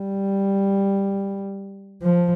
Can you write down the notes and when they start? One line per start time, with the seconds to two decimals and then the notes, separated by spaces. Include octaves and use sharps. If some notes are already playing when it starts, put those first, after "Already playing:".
Already playing: G3
2.02 F3